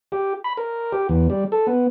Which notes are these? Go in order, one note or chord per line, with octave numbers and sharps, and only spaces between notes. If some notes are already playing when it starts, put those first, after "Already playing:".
G4
B5
A#4
G4
E2
G3
A4
B3